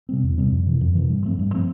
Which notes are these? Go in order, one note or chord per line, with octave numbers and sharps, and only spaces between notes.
C3 G3 C4
E2
C3 G3 C4
F2
C3 E3
F2
C3 E3
G2
F3 A3 C4
G2
F3 A3 C4